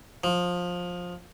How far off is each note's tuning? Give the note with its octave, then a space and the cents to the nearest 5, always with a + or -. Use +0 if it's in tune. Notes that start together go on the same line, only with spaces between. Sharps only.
F3 +20